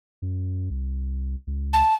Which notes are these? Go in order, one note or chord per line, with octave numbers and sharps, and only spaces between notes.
F#2
C2
C#2
A5